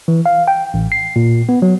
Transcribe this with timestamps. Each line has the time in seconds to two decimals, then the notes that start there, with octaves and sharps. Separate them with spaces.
0.08 E3
0.26 F5
0.48 G5
0.74 A1
0.92 C7
1.16 A#2
1.49 B3
1.62 F#3